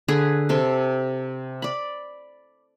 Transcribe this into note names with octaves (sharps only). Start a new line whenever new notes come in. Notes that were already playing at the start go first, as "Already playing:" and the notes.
D3 G#4 B4
C3 A4 C6
D5 B5